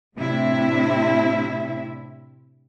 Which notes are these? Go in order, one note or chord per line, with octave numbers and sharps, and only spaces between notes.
A2 C3 C4 D4 E4 E5